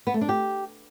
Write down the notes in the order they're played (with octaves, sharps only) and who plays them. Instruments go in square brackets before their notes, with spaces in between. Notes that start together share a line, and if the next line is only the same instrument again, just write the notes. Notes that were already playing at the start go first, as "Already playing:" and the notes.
[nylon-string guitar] B3
A3
D4
G4